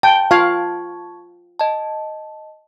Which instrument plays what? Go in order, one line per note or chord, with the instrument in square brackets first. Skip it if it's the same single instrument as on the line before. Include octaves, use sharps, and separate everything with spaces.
[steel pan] G5 [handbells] A5
[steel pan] F4 F5 [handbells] A5 C#6 G#6
[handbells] D#5 A5